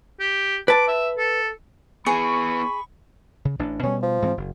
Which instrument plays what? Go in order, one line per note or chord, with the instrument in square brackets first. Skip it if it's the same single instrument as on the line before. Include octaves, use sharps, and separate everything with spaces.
[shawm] G4
[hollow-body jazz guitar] B4 A5 [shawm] D6
[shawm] E5
A4
[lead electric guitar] B3 E4 [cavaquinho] G#4 [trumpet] B5 [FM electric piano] C#6
[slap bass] C#3
A1 D4
[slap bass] B2 G3 [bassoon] C#4
[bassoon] F3
[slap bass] G#2 E3 C4
F#1